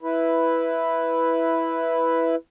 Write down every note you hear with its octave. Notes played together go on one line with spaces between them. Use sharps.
E4 B4